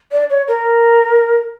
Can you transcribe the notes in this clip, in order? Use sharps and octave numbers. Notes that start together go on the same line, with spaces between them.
D5
C#5
A#4